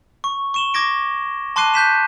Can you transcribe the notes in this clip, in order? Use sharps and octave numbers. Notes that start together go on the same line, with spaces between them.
C#6
C#6 E7 G7
C#6 D6 G#6 A#6 D7
A5 C6 D6 F#6 C7 D#7
F#6 G6 B6 E7